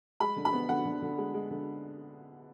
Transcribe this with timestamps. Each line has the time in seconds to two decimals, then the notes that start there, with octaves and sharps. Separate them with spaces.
0.20 G#3 B5
0.36 D3
0.45 B5
0.53 B3
0.69 D3 F#5
0.85 D3
1.02 D3
1.18 G#3
1.34 G#3
1.50 D3